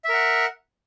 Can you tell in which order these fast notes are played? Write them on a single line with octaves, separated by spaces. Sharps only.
E5 A#4 F#5